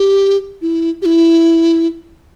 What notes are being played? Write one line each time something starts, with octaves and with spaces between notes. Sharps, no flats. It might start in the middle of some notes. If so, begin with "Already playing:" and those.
Already playing: G4
E4
G4
E4